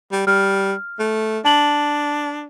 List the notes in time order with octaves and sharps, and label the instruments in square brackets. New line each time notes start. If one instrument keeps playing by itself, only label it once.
[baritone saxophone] G3
[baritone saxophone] G3 [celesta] F6
[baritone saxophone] A3
[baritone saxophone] D4 [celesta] A5 F#7